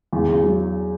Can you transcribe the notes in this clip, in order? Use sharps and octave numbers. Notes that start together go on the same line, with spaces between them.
E2
E2
F#3